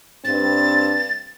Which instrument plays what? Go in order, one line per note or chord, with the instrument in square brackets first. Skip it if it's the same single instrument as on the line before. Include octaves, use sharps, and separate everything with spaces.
[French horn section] G2 C4 [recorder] A6